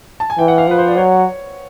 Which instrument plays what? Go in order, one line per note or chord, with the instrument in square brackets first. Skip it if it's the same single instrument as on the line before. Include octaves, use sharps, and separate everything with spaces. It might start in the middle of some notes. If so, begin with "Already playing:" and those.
[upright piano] A5
G#5
[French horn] E3 [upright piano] G5
[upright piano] F#5
F5
[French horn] F3 [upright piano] B4
[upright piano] C5
D5
[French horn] F#3 [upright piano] C#5